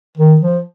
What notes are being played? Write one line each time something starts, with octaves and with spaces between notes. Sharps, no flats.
D#3
F3